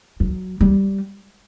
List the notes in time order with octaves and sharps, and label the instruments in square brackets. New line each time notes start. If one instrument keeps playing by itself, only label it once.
[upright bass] F#3
G3